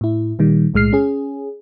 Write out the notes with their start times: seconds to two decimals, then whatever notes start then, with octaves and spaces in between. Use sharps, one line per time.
0.01 A2 E4
0.39 A#2 D#3 G3
0.74 B1 A2 G#3 F6 C7
0.93 C#4 G#4